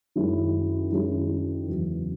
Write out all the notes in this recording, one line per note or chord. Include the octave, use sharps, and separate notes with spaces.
F#2 D#3 G#3 C#4 E4
F#2 D#3 G#3 C#4 E4
E2 C#3 F#3